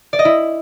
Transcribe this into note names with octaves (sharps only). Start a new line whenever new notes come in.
D5
D#5
E4